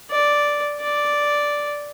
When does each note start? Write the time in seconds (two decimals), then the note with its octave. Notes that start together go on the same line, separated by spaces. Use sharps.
0.11 D5
0.80 D5